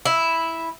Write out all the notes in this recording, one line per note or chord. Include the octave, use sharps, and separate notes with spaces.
E4